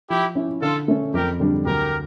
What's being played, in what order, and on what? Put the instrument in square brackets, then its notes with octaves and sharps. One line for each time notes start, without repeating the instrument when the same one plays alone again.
[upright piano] F3 [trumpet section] E4 G4
[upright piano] C#4 E4
[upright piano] D3 [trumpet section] F4 A4
[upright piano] A3 C#4
[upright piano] F2 [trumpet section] G4 A#4
[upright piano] D3 G3 D4
[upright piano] D2 [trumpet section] G4 A#4